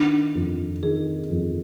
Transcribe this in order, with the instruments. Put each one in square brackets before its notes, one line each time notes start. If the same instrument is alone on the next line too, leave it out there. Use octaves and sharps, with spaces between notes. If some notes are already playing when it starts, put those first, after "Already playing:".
Already playing: [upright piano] D#3 [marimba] D4
[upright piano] F2
[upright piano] D#3 [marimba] G#4
[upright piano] F2